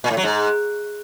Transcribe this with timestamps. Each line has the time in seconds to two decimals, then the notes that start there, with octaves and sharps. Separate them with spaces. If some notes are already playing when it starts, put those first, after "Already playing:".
0.04 A#2
0.11 A2
0.17 F#3
0.24 G#2